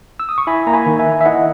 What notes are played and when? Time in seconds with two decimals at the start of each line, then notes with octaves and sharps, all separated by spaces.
0.20 E6
0.29 D#6
0.38 C#6
0.47 E4 G#5 B5
0.67 A#3 A#5
0.73 G#5 B5
0.86 D#3
0.99 E5 G#5
1.06 D#3
1.21 E5
1.25 E4 D#5 F#5